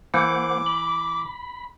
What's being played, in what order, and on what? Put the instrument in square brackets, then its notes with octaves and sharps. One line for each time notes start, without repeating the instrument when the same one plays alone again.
[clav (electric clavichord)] E3 [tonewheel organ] A#3 C5 F#5 [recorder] D6
[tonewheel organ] B5